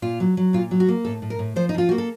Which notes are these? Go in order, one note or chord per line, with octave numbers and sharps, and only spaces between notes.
A#2 F4
F#3
F#3
A#2 F4
F#3
F#4
A#3
A2 A4
A2
A#4
A2
F3 C5
D#4
F3 F4
A#3 F#4
A4